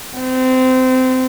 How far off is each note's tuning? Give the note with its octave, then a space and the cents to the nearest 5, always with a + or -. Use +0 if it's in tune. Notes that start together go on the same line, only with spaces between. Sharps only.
C4 -25